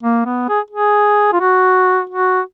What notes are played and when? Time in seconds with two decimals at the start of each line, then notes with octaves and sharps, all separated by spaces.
0.03 A#3
0.26 B3
0.49 G#4
0.71 G#4
1.33 F4
1.41 F#4
2.10 F#4